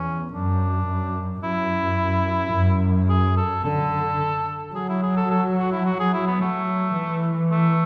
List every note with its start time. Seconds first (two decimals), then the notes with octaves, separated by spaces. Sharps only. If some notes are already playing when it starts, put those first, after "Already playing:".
Already playing: E2 C#4
0.33 F#2 D4
0.88 F#2
1.43 F#2 E4
2.54 F#2
3.09 G#4
3.37 A4
3.64 D3 A4
4.75 F#3 G#4
4.89 E4
5.03 G#4
5.17 A4
5.31 A4
5.58 F#4
5.72 E4
5.86 F#4
6.00 G#4
6.13 E4
6.27 B3
6.41 F#3 A3
6.97 E3
7.52 A3